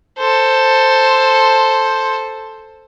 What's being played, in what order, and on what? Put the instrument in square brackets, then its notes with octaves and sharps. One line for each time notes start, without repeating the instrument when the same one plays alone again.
[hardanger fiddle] A4 C5